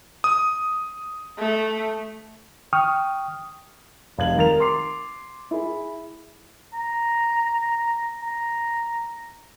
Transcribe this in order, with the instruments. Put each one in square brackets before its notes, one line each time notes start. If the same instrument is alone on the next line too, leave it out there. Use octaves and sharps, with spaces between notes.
[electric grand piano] D#6
[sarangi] A3
[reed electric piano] G5 C#6 D#6 F6
[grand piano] F1 F5 G#6 F#7
D#3 A#4 A6 F7
C6 D6 C7
E4 G#4
[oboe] A#5
A#5